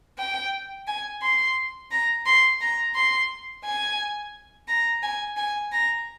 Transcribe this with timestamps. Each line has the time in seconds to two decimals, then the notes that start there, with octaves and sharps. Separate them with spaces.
0.18 G5
0.87 G#5
1.22 C6
1.91 A#5
2.26 C6
2.61 A#5
2.95 C6
3.65 G#5
4.68 A#5
5.03 G#5
5.37 G#5
5.72 A#5